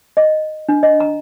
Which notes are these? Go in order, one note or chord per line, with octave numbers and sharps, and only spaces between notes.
D#5
D4
D#5
A#5